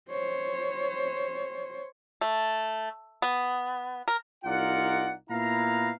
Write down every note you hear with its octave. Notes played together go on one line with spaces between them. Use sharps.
C5 C#5
A3
B3
A#4
C2 D#4 F4 A#4 D5 F#5
A#2 B3 E4 F5 A#5